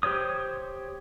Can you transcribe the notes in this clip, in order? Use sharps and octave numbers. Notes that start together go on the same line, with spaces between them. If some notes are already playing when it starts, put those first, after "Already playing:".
G4 C5 C#5 D#6